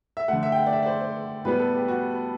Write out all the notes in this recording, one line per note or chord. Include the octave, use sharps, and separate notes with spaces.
E5
D3 A3 F#5
E5
G5
F#5
D5
E5
D5
C5
C5
A2 G3 B3 B4
A4
G4
F#4